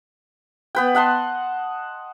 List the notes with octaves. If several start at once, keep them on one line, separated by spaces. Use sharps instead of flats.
B3 B4 G5
D#5 F#5 A5 C6